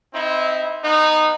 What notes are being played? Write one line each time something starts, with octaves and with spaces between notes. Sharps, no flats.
C4 D#4 E4
B3 D#4